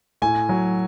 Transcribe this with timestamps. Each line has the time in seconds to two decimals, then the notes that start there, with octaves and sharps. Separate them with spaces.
0.22 A2 G#5
0.49 F#3